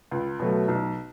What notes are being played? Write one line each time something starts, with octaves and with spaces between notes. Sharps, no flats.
C#2
B2 F#3 A3
B1